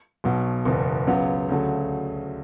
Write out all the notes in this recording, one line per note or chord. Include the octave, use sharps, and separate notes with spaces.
B1 B2 F#3
F#1 E2 B2
C#2 C#3 F#3 B3
D2 C#3 F#3 A3